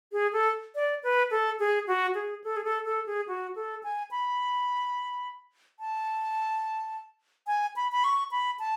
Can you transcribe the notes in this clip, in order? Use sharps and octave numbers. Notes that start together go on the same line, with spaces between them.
G#4
A4
D5
B4
A4
G#4
F#4
G#4
A4
G#4
A4
A4
G#4
F#4
A4
G#5
B5
A5
G#5
B5
B5
C#6
B5
A5